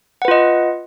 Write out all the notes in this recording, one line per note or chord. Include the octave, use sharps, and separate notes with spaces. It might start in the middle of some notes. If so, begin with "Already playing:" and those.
F4 B4 D#5 F#5